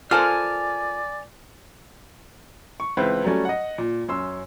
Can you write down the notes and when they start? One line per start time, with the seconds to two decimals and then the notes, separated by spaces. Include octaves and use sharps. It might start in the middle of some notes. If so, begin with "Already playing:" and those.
0.11 F4 A4 A#4 C5 D5 G#5 F6
2.80 C#6
2.97 C#2 E3 C4 E4 B4
3.24 F#3 G3 A3 C#4
3.45 D#5 F#5
3.78 A#2
4.08 F#2 C#4 C6 E6